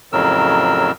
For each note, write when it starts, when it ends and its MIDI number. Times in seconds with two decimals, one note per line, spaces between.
0.13 0.91 41
0.13 0.91 45
0.13 0.91 49
0.13 0.91 54
0.13 0.91 70
0.13 0.91 88